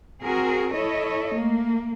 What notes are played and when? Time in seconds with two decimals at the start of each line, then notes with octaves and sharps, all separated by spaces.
0.22 C4 F#4 G#4 A#4
0.74 E4 A4 C#5 D#5
1.35 A3 A#3